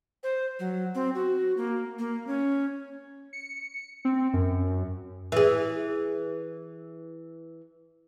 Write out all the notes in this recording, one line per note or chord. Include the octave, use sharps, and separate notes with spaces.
C5
F#3
C4
F#4
A#3
A#3
C#4
C#7
C4
F#2
E3 G#4